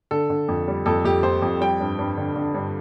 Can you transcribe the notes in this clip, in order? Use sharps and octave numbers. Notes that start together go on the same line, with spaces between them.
D3 A4
D3
F2
G3
F2 A4
F2 G4
F2 C5
F2
G3 G5
G2
G2
D3
D3
G2